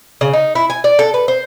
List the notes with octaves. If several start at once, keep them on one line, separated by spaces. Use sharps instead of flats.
C#3
D#4
E4
G#5
D5
A4
B4
C5